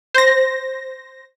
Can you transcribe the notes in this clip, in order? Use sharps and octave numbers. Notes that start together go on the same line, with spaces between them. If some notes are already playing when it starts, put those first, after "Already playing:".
C5 A#6